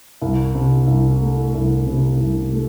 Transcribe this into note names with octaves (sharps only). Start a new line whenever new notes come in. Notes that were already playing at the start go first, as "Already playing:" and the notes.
C2
C3
C2
A3
C2
C3
C2
A3